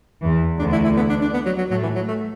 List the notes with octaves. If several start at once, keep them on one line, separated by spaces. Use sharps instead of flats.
E2 E3
D2 D3 D4
E4
E4
B3
D4
D4
B3
F#3
F#3
A2 F#3 A3
E3
F#3
A3